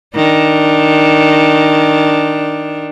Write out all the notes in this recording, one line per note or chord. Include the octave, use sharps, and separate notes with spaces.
D#3 D4